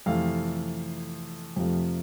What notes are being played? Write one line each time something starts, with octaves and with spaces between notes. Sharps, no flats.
F2 C3 E3 A3 F5
F2 C3 F3 A3